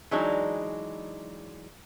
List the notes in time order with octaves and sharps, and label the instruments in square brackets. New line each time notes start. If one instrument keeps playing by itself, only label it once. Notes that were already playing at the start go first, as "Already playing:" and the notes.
[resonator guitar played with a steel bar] E3 F#3 G#3 D4 D#4